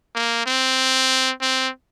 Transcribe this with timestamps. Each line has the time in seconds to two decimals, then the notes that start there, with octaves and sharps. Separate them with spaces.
0.15 A#3
0.46 C4
1.41 C4